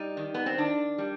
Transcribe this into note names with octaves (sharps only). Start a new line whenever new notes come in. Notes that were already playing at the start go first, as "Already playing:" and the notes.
Already playing: G3 D#4
D#3
B3
C4
D#3 D4
G3